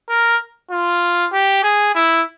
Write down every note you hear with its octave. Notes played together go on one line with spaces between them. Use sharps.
A#4
F4
G4
G#4
E4